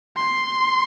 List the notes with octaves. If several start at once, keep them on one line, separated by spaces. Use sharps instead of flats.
C6